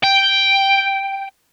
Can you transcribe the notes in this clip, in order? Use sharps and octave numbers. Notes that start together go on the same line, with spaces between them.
G5